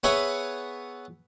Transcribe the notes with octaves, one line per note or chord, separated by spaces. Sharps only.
B3 G#4 B4 C#5 E5 F#5